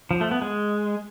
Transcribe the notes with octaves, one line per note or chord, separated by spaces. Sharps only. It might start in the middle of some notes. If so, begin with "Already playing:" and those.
F3
A3
B3
G#3